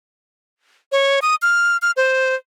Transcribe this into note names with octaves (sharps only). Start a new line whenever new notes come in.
C#5
D#6
F6
F6
C5